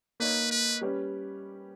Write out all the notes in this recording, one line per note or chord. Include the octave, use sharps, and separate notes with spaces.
A#3 D#4 A#4 B4 C#5
B4
G3 C#4 G4 B4